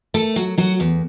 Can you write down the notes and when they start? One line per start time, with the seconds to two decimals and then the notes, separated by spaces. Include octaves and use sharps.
0.14 A3 A4
0.36 F#3 F#4
0.58 F#3 F#4
0.80 E2